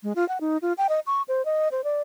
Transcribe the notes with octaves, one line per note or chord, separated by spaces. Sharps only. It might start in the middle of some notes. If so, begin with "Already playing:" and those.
G#3
F4
F#5
D#4
F4
G5
D#5
C#6
C5
D#5
C5
D5